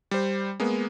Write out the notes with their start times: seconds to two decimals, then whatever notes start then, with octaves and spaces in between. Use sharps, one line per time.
0.11 G3 C5
0.60 G#3 A#3 B3